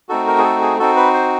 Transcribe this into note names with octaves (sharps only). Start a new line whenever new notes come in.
A3 C4 D#4 F#4 A4
A#4
G#4
A4
G#4
C4 D#4 F#4 A4
B4
C5